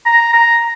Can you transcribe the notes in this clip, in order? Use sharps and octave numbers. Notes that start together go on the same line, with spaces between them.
A#5
A#5